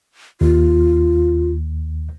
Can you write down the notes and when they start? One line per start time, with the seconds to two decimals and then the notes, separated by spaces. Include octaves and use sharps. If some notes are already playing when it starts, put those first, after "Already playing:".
0.41 D#2 F4